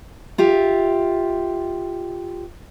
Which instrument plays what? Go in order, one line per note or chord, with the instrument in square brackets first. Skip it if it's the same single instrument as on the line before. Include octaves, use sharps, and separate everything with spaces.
[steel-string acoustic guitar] F4 G4 E5